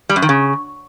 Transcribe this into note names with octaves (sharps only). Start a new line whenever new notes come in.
G3
F#2
D#3
C#3